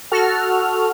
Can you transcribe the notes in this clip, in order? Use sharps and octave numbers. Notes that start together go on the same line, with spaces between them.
F#4 A4 F6